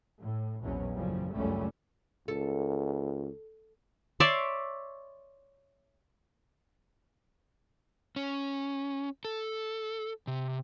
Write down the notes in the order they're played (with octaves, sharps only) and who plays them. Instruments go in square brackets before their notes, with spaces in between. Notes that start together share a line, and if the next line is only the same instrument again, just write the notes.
[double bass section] A2
A#1 E2 B2 F#3 C#4
F#1 F#2 A2 C#3 F3 G3
G#1 C#2 F#2 G3 A3 C#4
[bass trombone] C#2 [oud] A4
[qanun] C#5 D5 E5 C6
[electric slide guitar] C#4
A4
C3